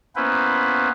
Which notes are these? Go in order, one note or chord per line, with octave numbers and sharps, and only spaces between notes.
A#3 B3 C#4 E4 B4 C5